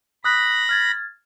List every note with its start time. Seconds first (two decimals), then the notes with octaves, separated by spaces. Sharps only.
0.24 B5 D#6 F#6 A#6
0.69 F6 G#6 A6